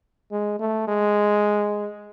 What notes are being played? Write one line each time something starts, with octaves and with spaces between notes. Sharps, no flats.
G#3
A3
G#3